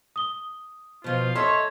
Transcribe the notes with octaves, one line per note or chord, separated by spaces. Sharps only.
D#6 G7
B2 F3 F4
A4 C#5 D#5 E5 C6